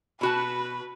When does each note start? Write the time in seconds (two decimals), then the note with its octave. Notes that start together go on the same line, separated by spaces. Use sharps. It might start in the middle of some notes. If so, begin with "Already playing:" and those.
0.21 B2 F#4 B4 A5